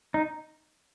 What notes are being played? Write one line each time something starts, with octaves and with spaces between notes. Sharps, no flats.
D#4